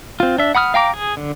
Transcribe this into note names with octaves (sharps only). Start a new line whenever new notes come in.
C4 F4
D4 E5
F#5 B5 D#6 F6
F5 G5 A#5 D6
G#4
D3